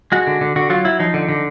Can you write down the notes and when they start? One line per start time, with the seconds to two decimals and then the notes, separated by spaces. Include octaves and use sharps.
0.12 G#3 F#4
0.27 D3
0.41 D3
0.56 D3 F#4
0.70 F#3 F4
0.85 F#3 E4
1.00 F3 D#4
1.14 D3
1.29 D3